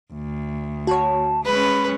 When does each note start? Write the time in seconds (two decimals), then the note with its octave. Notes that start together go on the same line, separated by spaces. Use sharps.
0.13 D2
0.87 F#4 C#5 A5
1.45 G#3 C#4 B4 B5